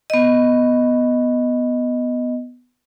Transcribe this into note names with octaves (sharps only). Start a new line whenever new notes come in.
B3 D#5